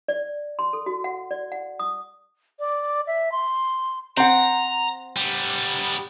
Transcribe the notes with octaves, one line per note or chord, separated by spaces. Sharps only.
D5
C6
A4
F#4
F#5
D5
F#5
D#6
D5
E5
C6
C4 F#5 A#5
G3 B3